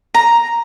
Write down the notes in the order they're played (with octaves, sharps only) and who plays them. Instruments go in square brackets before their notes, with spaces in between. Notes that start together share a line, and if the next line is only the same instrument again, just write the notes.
[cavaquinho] A#5